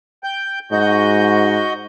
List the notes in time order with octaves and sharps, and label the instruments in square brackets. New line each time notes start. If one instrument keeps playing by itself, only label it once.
[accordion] G5 G6
[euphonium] G#2 [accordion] F#4 D#5 G6